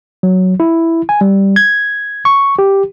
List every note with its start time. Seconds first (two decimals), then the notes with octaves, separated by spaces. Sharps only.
0.23 F#3
0.60 E4
1.09 G#5
1.21 G3
1.56 G#6
2.25 C#6
2.59 G4